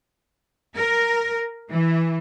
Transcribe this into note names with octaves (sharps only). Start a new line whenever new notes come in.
A#4
E3